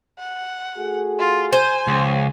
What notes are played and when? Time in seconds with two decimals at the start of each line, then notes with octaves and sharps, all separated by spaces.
0.19 F#5
0.77 A3 F#4 G#4
1.19 F4
1.53 C5 G#5
1.88 C#2 C#3 F3